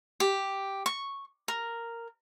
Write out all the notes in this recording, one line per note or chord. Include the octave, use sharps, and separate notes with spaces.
G4
C#6
A#4